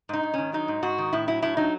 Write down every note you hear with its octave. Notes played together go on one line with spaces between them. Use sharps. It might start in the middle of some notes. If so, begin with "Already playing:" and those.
G#2 D#4
G#2
D#3 C#4
F#3 D#4
G#2
G#2 F#4
D#3
A2 E4
F#3 E4
A2 E4
F#3 D#4